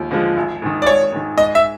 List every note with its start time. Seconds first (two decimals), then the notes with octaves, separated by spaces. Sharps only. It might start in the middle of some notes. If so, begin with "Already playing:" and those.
Already playing: D#2 D3 F3 G#3
0.11 D3 F3 G#3
0.37 G#1
0.62 G#2 D#3
0.82 D5
0.86 G#1 C#5
1.12 G#2 D#3
1.37 G#2 D#5
1.55 E5